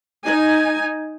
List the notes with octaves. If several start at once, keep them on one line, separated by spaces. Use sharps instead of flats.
D#4 G#5